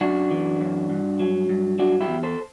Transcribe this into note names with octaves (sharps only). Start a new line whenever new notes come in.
F#2 D4 F#4
E3
F#2
G2
F#3
G2
F#3 D4 F#4
E4 G4
E2
A4 C5